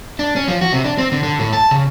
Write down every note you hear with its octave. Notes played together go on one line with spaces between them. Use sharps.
D4
C#4
F3
F#4
C3
D4
C4
D3
D3
A2
A5
C#3